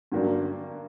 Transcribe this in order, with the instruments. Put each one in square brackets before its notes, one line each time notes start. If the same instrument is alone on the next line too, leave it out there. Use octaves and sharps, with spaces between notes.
[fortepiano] G2 D3 F#3 A#3 D4